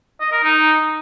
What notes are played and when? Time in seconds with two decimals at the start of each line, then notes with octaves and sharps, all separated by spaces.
0.21 D#5
0.32 A#4
0.43 D#4